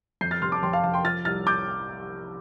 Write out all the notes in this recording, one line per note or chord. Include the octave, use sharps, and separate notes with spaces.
F2 G6 C7
F6 A6
F1 C6 F6
A5 D6
F1 G5 C6
F5 A5
F1 F5 A5
G5 C6
F3 F6 A6
C2 F6 A6
D6 G6